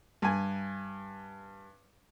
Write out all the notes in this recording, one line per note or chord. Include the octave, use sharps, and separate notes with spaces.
G2 G#5